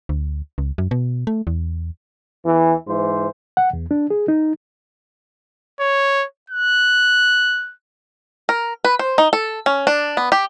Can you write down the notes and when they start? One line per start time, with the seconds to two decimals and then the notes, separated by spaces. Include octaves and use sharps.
0.09 D2
0.58 C#2
0.78 F#2
0.91 B2
1.27 A3
1.47 E2
2.45 E2 E3
2.87 G#2 E3 C5
3.57 F#5
3.73 E2
3.91 D4
4.10 G#4
4.28 D#4
5.80 C#5
6.50 F#6
8.49 A#4
8.84 B4
8.99 C5
9.18 D#4
9.33 A4
9.66 C#4
9.87 D4
10.17 B3
10.32 G4